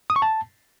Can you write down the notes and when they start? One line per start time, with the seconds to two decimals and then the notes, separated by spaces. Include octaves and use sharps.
0.10 D#6
0.16 C#6
0.22 A5